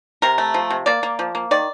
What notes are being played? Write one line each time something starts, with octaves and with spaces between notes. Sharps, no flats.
C3 A#4
A3
F3
C3
A#3 D5
A#3
F3
A#3
D#3 D5